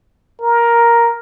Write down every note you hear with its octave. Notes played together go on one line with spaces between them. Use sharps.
A#4